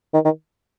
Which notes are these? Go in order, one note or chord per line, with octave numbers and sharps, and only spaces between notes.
D#3
D#3